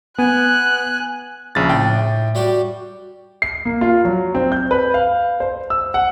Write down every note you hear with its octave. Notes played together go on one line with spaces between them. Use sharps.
B3 G#5 F#6
A#1 C#3 A6
A2 G5
G3 F#4 G4
C7
A#3
F4
F#3
C4
G6
B4
F5
C5
E6
F#5